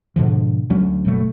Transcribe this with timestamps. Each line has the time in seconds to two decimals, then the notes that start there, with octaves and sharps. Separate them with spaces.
0.16 G#2 B2 D3 F3
0.70 D2 F#3 C#4
1.05 F#1 B2 F#3 A3